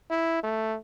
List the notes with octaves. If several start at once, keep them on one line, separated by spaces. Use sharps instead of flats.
E4
A3